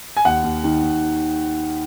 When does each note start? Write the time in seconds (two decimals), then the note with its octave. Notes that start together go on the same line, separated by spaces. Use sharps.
0.17 G#5
0.25 D#2 F#5
0.43 D#2
0.64 D#3
0.83 D#2